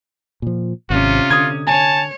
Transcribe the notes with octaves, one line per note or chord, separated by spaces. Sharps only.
A#2 F3
G#1 C3 C#4 F4
D3 D#6 G#6
C#5 G#5 A5